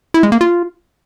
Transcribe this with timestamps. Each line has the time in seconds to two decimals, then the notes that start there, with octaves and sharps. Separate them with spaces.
0.14 E4
0.23 G#3
0.32 A#3
0.41 F4